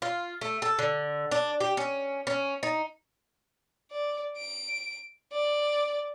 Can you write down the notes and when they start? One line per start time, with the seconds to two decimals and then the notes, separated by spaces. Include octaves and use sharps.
0.02 F4
0.41 A3
0.62 A4
0.79 D3
1.31 D4
1.60 G4
1.77 C#4
2.27 C#4
2.63 D#4
3.91 D5
4.38 D7
5.33 D5